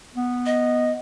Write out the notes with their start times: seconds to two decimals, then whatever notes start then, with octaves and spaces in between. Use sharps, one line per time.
0.15 B3
0.46 D#5